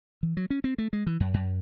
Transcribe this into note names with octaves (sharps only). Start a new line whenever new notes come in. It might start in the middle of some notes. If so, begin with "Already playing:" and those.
E3
F#3
C#4
C4
A3
G#3
E3
F#2
F#2